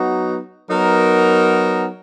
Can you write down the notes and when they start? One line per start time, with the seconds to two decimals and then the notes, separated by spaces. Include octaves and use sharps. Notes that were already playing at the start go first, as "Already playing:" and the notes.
Already playing: F#3 B3 D#4 F#4
0.69 F#3 B3 D#4 A#4